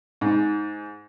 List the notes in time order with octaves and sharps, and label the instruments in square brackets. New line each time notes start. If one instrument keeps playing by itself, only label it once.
[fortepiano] G#2